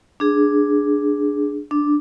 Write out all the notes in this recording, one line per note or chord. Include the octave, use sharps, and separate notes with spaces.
D4 G#4
D4